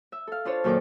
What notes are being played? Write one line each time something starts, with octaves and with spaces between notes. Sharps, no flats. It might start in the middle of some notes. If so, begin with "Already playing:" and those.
E5
A4 F5
D4 F4 C5 C#5 A5
F#2 A#2 D#3 A4 D6